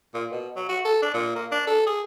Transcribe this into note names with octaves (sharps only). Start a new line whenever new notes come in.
A#2
B2
F#3
F#4
A4
D4
A#2
A#3
D4
A4
G#4